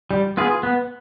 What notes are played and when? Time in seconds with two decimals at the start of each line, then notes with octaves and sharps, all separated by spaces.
0.11 G3
0.37 B3 F4 G#4
0.63 B3